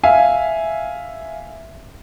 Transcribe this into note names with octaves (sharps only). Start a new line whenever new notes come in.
E5 F5 G#5